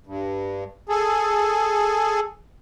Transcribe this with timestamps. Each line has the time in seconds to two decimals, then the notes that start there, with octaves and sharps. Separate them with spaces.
0.06 G2
0.89 G#4 A4